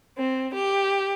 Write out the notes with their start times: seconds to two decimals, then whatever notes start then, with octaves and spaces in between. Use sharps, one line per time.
0.17 C4
0.54 G4